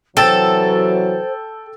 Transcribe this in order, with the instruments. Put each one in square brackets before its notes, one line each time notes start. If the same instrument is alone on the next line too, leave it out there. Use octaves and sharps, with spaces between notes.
[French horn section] C3 E3 F#3 [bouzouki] A4 [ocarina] C5 [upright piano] G5 E6 A6